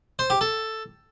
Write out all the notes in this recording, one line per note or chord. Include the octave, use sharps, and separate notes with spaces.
C5
G4
A4